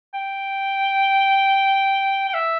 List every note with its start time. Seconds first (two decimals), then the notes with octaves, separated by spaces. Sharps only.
0.14 G5
2.29 G5
2.34 E5